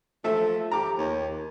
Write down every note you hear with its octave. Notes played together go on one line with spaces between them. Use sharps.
F3 A3 A4 E5
G4 A#5 D6
D#2